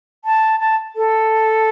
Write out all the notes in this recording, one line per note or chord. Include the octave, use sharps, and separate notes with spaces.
A5
A5
A4